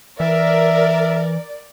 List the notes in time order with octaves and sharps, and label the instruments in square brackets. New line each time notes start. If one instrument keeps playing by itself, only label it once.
[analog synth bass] E3 [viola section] A#4 [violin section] D5 [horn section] E5